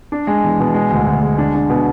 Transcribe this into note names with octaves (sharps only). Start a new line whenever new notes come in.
D4
G#3
E2
B2
G#3
D2
D2
G#3
D4
D4
B2